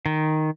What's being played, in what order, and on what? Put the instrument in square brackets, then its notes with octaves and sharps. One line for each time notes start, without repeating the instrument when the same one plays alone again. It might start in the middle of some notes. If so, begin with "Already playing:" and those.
[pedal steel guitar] D#3